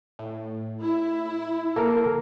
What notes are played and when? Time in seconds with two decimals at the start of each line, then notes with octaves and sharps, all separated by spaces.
0.19 A2
0.82 E4
1.76 A#3 A4 A#4